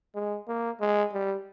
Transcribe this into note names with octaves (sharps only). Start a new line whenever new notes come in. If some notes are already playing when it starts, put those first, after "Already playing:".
G#3
A#3
G#3
G3